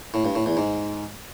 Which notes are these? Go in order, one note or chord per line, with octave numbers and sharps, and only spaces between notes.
A2
G2
A2
E2
G#2